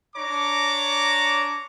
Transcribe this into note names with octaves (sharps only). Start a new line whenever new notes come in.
D4 C#5 A#5 D6